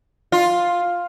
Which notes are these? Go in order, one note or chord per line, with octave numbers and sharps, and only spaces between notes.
F4